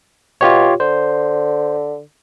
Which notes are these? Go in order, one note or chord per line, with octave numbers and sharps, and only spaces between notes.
B2 F4 G4 C#5
D3 C5